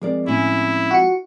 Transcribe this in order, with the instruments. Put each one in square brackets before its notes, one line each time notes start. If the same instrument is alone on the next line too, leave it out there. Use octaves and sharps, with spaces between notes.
[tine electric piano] F3 G#3 C4 [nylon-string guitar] G#4 A#4 D5
[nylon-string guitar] A2 C#4 [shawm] E4
[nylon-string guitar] F4 [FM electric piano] F#4 C#7